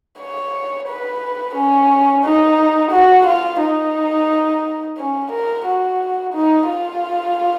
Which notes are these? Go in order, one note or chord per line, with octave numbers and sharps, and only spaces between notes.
C#5
B4
C#4
D#4
F#4
F4
D#4
C#4
A#4
F#4
D#4
F4